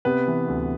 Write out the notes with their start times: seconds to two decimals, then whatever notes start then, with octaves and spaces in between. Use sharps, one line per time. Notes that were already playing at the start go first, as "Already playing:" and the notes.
0.05 C3 B3 B4
0.27 E3
0.48 D2